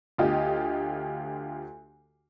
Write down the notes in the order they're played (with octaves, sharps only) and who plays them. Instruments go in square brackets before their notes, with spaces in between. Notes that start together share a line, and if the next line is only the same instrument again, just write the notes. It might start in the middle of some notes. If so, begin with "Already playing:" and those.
[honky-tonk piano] D2 F4 G4 D#5